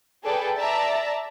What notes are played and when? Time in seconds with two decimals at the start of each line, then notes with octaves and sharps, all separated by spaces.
0.24 G#4 A4 B4 D5 G5
0.57 D5 E5 A5 A#5